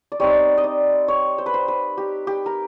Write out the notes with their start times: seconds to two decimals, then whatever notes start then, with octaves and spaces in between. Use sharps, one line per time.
0.12 D5
0.20 G3 C4 D#4 C#5
0.58 D#5
0.64 D5
1.08 C#5
1.38 C5
1.46 B4
1.54 C5
1.68 B4
1.97 G4
2.27 G4
2.46 A#4